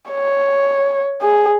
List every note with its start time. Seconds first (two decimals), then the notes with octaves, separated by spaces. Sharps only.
0.11 C#5
1.22 G#4